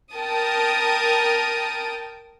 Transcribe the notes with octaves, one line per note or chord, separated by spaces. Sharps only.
A#4 G5 A5 D#6